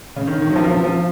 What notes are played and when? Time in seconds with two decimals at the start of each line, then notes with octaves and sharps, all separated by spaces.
0.16 C#3
0.28 D#3
0.42 D#3
0.50 F#3
0.56 F3
0.71 F3
0.84 F3